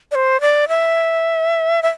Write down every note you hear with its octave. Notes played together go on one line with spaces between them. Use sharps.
D5
C5
D5
E5
E5